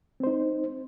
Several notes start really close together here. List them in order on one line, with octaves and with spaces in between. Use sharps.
C4 C5 D#4